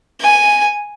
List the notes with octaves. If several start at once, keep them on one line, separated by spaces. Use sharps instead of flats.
G#5